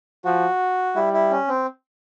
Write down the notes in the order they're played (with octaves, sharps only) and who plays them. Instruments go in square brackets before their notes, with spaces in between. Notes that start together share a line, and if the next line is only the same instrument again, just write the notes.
[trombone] F3 [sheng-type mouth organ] F#4
[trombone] G3 [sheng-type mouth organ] E4
[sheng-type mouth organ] E4
C#4
C4